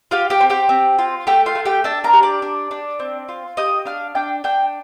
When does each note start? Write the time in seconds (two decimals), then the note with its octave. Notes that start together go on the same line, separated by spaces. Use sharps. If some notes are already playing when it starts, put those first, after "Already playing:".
0.11 F4 G4 F5
0.30 G4 G5
0.40 C4
0.50 G4 G5
0.69 C4
0.99 F4
1.27 A3 G4 G5
1.46 F4 F5
1.55 A3
1.65 G4 G5
1.84 D4 A4 A5
2.04 A#4 A#5
2.13 G4
2.23 D5 D6
2.42 D4
2.71 D4
3.00 C4
3.29 F4
3.57 G4 D#5 D#6
3.85 D4 F5 F6
4.15 D4 G5 G6
4.44 D4 G5 G6